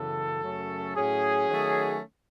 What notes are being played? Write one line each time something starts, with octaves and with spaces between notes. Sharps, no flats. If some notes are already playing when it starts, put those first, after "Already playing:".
Already playing: F#2 C#3 E3 B3 A4
F#2 C#3 F#3 A3 C#4
A2 F#3 C#4 G#4
D#3 F#3 A3 C#4